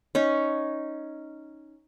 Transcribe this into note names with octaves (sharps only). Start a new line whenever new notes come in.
C#4 D#4 C#5